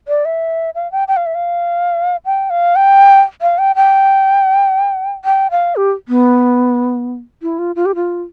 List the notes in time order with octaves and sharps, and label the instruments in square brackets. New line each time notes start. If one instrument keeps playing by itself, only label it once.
[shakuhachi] D5
E5
F5
G5
G5
F5
E5
F5
G5
F5
G5
F5
G5
G5
G5
F5
G4
B3
E4
F4
F4
G4
F4